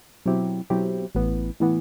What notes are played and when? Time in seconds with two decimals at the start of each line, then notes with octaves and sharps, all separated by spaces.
0.26 B2 F#3 C4 E4 G4
0.70 B2 F#3 C4 E4 G4
1.15 A1 A2 E3 B3
1.60 A2 E3 B3